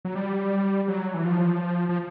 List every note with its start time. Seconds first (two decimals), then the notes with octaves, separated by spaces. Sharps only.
0.05 F#3
0.15 G3
0.88 F#3
1.14 E3
1.25 F3
1.89 F3